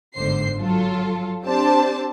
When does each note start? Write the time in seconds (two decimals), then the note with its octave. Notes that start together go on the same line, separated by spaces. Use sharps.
0.15 G1 G#2 D3 C5 C7
0.59 F#3 F4 A4
1.45 C4 D4 G4 C5 D5 A5